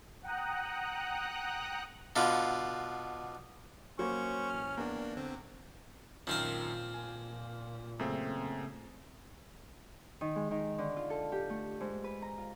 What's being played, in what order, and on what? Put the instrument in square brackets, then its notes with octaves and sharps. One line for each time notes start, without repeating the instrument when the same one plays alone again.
[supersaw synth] F#5 G5 A#5 D#6 F#6
[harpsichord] B2 D3 B3 F4
[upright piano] F#3 A#3 [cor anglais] C#4 [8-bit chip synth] C5 C#6
[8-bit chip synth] A1 F6
[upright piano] E2 [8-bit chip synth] A#3 D4
[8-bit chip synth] D3 C4
[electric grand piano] F#2 D#3 [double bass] A#2 [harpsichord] F3 C4 F5
[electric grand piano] G#5
[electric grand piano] F#2 C4 [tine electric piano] C#3 A3 A#3
[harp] D#3
G#3
D#3
D3
F4
A4
G4
A3
G#2
B4
A#5
F4